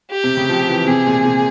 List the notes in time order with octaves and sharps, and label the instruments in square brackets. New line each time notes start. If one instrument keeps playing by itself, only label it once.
[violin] G4
[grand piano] C3
C#3
F3
E3
[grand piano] C3 [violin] G#4
[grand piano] A#2
C3